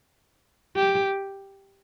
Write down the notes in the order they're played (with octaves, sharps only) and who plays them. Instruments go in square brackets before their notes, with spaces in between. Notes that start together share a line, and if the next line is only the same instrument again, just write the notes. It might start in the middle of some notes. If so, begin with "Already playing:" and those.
[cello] G4